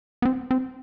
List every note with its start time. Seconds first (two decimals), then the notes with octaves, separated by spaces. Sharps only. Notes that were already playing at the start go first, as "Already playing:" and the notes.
0.22 B3
0.25 C4
0.51 C4